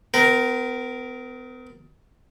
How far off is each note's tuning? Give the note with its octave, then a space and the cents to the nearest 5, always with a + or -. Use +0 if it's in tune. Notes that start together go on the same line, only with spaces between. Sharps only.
B3 +40 A#4 +0